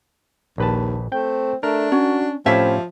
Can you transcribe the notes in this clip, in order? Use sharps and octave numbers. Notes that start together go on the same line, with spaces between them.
A#1 D#2 B4 A5
A3 C4 G5
A3 D4 A#4
C#4 F#4
A2 F3 C4 C#4 E4 G4 E5 F5